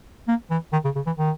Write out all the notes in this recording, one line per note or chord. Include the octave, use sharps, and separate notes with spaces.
A#3
E3
D#3
C#3
C#3
E3
D#3